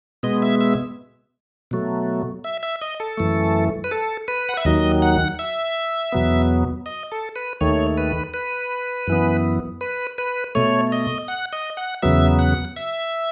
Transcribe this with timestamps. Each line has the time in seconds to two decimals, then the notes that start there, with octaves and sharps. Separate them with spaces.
0.23 B2 G#3 B3 D#5
0.42 E5
0.61 E5
1.71 B2 F#3 A3
2.44 E5
2.63 E5
2.82 D#5
3.00 A4
3.17 F#2 E3 A3
3.84 B4
3.91 A4
4.28 B4
4.49 F#5
4.57 E5
4.65 D#2 D#3 F#3 D#5
5.02 F#5
5.39 E5
6.12 E2 B2 F#3 B3
6.86 D#5
7.12 A4
7.36 B4
7.61 D#2 D#3 A3 C#5
7.98 B4
8.34 B4
9.07 F#2 E3 B3
9.81 B4
10.18 B4
10.55 B2 A3 C#5
10.92 D#5
11.28 F#5
11.53 D#5
11.77 F#5
12.02 E2 C#3 F#3 B3 E5
12.39 F#5
12.76 E5